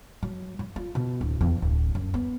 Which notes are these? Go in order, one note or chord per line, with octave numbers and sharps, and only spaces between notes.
F#3
F#3
F4
B2
D1
E2
D1
F#2
B3